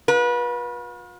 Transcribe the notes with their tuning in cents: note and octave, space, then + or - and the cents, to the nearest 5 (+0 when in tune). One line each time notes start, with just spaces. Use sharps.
F4 +45 B4 -30